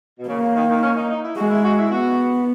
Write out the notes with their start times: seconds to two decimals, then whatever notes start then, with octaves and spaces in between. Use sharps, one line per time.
0.19 B2
0.28 C#3 A#3
0.41 C#3
0.55 D#3
0.69 D#3
0.83 C#4
0.96 D#4
1.10 D#4
1.24 E4
1.37 G#3 F#4
1.51 E4
1.64 F#4
1.78 E4
1.91 B3 F#4